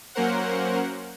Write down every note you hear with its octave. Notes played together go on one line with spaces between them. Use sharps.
F#3 A#3 C#4 A#4 C5 F#5